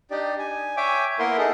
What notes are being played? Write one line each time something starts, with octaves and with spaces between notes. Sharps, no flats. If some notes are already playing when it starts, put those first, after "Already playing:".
D4 D#4 G4 D5
G#5
C#5 E5 G5 G#5 D6
A#3 B3 E4 A#4 C6
D#4 G#4 A4